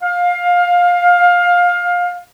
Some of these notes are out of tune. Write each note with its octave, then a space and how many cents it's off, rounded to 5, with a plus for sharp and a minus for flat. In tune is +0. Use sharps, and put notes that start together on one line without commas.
F5 +20